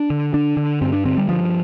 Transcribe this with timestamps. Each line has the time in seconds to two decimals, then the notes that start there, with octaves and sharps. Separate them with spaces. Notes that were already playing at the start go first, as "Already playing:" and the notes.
Already playing: D4
0.10 D3
0.34 D3 D4
0.57 D3
0.81 G2 C4
0.93 D4
1.05 D3 C4
1.17 G3
1.29 G2 F3